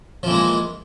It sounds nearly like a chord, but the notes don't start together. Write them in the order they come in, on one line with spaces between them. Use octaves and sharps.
F3 E3 A#3 G#3